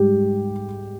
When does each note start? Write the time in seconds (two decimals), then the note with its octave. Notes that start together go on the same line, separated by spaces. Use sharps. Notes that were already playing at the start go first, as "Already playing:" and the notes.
Already playing: G#2 G3 G4